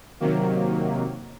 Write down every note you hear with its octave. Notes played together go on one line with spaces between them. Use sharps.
C3 D#3 F#3 A#3